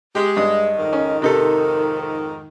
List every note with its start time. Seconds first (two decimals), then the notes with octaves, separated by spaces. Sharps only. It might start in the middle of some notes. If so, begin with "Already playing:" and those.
0.15 G#3 G4
0.37 G2 D#5 D#6
0.76 F2 G#2 D#3
0.93 C#4
1.22 C3 D#4 A4 A#4